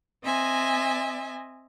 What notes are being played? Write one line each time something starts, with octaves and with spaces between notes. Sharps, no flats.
C4 D#5 E5 G#5